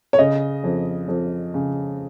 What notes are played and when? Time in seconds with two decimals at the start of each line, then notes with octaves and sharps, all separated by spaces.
0.13 C#5
0.18 C#3 D#5
0.64 F2
1.08 F2
1.54 C#3